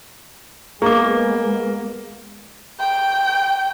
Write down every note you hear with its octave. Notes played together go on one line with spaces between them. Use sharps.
G#3 A#3 B3 G#4 D6
G5